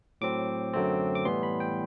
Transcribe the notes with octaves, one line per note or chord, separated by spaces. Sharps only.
A2 F#3 C4 D6
F#2 D3 F#3 A3 C4
D6
A2 E3 G3 B3 C6
B5
G5